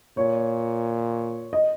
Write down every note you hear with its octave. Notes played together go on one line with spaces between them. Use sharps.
A#2 C#5
D#5